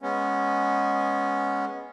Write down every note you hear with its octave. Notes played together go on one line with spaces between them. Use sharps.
G#3 B3 C#4